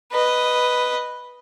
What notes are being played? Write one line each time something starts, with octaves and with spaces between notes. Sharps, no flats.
B4 D#5